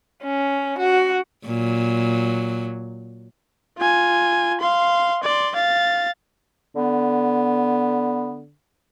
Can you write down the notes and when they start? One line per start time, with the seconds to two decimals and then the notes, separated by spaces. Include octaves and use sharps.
0.23 C#4
0.79 F#4
1.45 A#2 F#3
3.78 F4 G#5
4.61 F5 C6
5.23 D5 C6
5.55 F5 A6
6.76 D3 B3